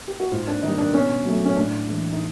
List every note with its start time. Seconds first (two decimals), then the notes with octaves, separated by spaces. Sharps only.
0.08 G4
0.20 F#4
0.32 G#2 F4
0.47 D4
0.63 D#3 G3 D#4
0.78 D4
0.94 B2 C#4
1.25 F#3 A3
1.45 C#4
1.56 A2 D4
1.88 E3 G#3
2.12 D#4